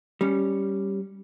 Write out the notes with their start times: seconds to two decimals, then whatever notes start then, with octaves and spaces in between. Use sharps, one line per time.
0.21 G3 C#4